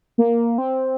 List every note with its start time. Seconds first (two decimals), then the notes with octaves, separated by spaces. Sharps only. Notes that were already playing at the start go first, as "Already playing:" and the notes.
0.18 A#3
0.58 C4